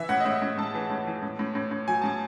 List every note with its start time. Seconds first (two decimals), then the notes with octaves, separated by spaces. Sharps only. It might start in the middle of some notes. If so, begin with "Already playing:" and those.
Already playing: E3 E5
0.09 A2 F#5
0.20 D#5
0.25 A2 E5
0.42 A2
0.58 A2 A5
0.75 E3
0.90 A2
1.07 E3
1.22 A2
1.39 A2
1.55 A2
1.71 A2
1.87 F#3 G#5
2.02 A2 A5